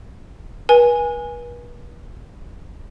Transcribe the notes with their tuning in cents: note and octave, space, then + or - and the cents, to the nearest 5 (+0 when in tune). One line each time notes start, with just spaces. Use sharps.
B4 -40 G#5 -5